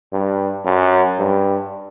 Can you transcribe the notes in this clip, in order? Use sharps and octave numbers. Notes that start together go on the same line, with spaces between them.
G2
F#2
G2